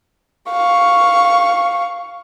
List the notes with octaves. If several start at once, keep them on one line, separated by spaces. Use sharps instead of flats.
F5 C#6